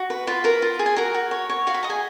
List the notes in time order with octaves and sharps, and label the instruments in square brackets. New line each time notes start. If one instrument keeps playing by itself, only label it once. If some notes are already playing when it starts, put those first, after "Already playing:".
Already playing: [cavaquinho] F#4
B4
F4 B4 B5
A#4 B4 A#5
F4
G#4
G#5
F#4 A#4 A#5
F#4
C#5
C#5
F#4 F5
B5
D#5 A#5
G#4 G#5